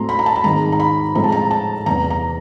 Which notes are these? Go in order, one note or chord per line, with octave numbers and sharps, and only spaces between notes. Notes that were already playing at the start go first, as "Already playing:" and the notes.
Already playing: A2 F#3 A3 C4 A#5 C6
B5
A#5
A5
B5
G#2 D#3 G#3 C4 A#5
A#5
B5
A2 F3 G#3 C4 A#5
A5
A#5
A5
E2 C3 E3 A#5
A#5